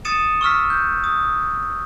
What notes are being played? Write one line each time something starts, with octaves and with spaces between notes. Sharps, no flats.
D#6 A6 C#7 D#7 E7
C#6 E6 F6 B6
G6
D#6